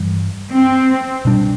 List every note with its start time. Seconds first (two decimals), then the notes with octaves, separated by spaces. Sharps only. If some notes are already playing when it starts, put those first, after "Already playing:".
Already playing: G2 E3 G3
0.51 C4
1.25 B2 G3 D4